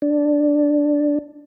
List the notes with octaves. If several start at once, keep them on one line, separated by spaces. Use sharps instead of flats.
D4